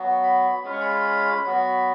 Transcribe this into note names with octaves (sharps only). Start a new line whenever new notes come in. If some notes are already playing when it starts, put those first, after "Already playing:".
Already playing: F#3 B3 F#4
B5
G#3 C#4 F4 B5
C#6
B5
F#3 B3 F#4